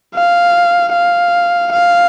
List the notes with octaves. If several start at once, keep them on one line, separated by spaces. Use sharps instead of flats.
F5
F5
F5